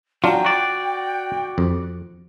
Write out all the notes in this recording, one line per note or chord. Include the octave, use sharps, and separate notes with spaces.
F#3 D4 F4 G5
F#4 D5
F2